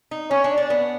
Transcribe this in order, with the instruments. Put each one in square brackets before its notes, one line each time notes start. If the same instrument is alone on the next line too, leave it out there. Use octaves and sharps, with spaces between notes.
[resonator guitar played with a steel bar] D#4
[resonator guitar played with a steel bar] C#4 [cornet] C#5
[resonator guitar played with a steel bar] D4
D4
B3